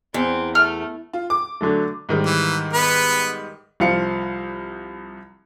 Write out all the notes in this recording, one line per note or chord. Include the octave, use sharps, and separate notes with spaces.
E2 C4
A3 F6
F4
D6
D3 F#3 A3
G#2 D#3 G3
E3
B3 B4
C2 F3 F5 C#7